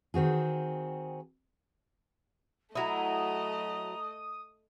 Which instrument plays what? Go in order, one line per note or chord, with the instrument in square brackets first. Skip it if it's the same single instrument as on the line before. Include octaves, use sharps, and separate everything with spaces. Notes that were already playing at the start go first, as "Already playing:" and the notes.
[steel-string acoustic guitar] D#3 C4 F#4 G#4
[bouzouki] F#3 E4 [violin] A3 D#5 [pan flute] A#5 [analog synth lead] D#6